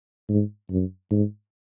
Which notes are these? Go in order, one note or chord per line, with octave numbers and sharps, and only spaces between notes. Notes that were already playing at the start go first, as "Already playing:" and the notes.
G#2
F#2
G#2